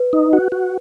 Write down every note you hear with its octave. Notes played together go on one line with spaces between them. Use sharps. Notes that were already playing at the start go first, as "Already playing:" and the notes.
Already playing: B4
D#4
F#4
F#4